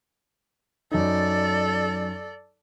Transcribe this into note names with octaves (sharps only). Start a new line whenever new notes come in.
F#2 D#4 A4 D5